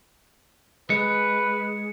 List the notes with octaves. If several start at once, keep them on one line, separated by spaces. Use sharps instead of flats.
G#3 B4 C#7